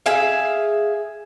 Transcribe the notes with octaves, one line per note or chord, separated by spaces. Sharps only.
G#4 E5 F5